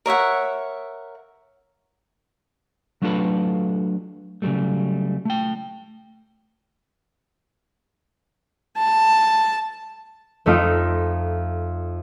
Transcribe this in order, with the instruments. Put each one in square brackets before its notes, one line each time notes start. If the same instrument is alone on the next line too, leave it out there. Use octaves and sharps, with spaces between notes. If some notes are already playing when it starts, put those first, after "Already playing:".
[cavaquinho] A#4 C#5 E5 F#5
[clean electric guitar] F#3 A3 D4 F4 A4 B4
C#3 E3 F#3 G3 A3
A3 G5
[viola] A5
[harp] F2 A3 D#4 F4 D#6 D7